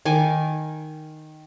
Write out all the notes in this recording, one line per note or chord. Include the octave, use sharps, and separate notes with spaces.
D#3 G#5 D6